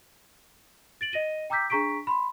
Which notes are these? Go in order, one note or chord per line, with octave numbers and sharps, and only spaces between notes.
A6 D7 F#7
D#5 A#6 D#7 G7
G5 A#5 D6 E6 G6 B6
D4 G#4 A#5 C#6 B6 D7
B5 C6